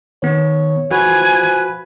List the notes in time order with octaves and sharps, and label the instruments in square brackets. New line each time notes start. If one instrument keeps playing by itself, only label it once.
[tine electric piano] D#3 B3 [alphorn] C#5
[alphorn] F3 [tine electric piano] F#4 [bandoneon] B4 [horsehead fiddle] G#5